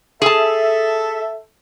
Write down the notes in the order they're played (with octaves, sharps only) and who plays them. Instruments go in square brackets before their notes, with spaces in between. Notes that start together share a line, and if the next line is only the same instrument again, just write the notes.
[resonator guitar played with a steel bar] G#4 A5 [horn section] A4 E5